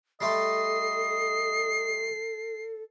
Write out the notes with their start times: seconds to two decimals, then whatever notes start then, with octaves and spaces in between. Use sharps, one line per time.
0.21 G3 A3 A4 D#5 C6 C7